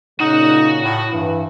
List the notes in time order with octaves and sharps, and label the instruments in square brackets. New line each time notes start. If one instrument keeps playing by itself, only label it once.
[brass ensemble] A#2 C#3 [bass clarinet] D#4 [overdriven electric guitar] F#4 F#5
[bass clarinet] A2
[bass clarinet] G2 [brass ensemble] E3